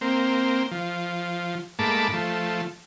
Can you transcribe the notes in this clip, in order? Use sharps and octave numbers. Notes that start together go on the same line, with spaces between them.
A#3 C4
F3
G#2 A3 A#3 A5 B5 D6
F3 A3